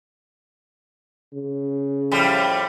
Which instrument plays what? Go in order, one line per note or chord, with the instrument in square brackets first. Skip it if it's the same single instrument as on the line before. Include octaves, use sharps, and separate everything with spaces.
[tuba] C#3
[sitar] F2 A2 G3